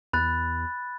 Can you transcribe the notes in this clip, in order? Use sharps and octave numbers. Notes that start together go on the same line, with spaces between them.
E2 B5 F#6 A6